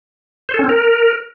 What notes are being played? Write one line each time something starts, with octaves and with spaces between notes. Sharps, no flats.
C5
A4
C#4
C4
A#4